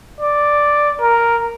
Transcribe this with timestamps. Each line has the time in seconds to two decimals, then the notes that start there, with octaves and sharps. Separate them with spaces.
0.21 D5
1.01 A#4